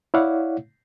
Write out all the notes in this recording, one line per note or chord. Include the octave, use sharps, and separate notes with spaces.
E4 C#5 D5 F5 F#5